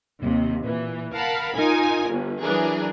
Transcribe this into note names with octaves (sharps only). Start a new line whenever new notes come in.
D#2 C3
A#2 E3
A#4 F5 F#5 A5 B5
D#4 F4 A#4 G#5
G1
E3 F#3 D4 G#4 A#4